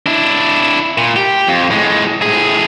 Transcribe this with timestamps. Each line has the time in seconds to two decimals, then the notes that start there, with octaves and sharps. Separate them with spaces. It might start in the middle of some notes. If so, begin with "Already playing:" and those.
0.06 D4 E4
0.98 A#2
1.16 G4
1.47 F2
1.70 A2 G#3
2.22 A2 G#4